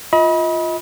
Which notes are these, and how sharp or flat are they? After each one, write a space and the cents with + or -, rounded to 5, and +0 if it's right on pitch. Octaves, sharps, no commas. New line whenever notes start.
F4 +0 D#5 +35 B5 -30